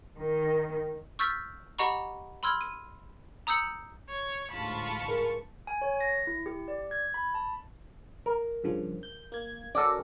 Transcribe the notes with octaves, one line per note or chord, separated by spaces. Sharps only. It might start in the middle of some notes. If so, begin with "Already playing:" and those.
D#3
C#6 E6 F6 G6 A6 B6
G4 D#5 F#5 A#5 B5 C#6
B5 C6 E6 F6 G#6
D#7
A#5 D#6 E6 G6 C#7 F#7
C#5
A1 D2 G#2 F4 A5 B5 C#6
G#4 A#4 B4
G#5
C#5
A#6
E4
G4
D5
G#6
B5
A5
A#4
G2 C#3 F3
G6
A#3 G#6
C#4 F#4 A4 A#4 D5